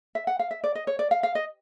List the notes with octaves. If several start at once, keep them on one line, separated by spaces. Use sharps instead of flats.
E5
F#5
F5
E5
D5
D#5
C#5
D5
F5
F5
D#5